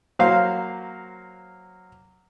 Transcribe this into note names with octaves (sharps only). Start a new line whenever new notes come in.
F#3 A#3 C5 F5